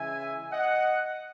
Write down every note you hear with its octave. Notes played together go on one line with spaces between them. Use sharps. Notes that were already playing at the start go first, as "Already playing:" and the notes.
Already playing: C#3 E3 G#3 E5 G#5
D#5 F#5